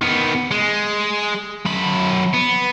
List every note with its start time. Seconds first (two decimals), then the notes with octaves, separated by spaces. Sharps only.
0.01 D#3 B3
0.51 G#3
1.66 F#2 B5
2.34 B3